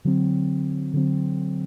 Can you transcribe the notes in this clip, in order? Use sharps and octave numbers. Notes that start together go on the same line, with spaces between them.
D3 F#3 C4
D3 F#3 C4